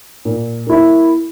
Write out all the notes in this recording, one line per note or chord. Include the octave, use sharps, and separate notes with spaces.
A#2
A#3 E4